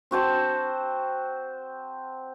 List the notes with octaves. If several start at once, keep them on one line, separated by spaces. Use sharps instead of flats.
C4 F#4 C5 A5